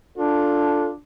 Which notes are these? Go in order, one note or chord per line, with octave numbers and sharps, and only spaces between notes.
D4 F4 A4